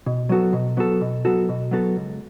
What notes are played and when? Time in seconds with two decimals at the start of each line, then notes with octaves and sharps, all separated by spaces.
0.06 B2
0.29 F#3 B3 F#4 A4
0.53 B2
0.77 F#3 B3 F#4 A4
1.01 B2
1.25 F#3 B3 F#4 A4
1.49 B2
1.71 F#3 B3 F#4 A4
1.96 C#2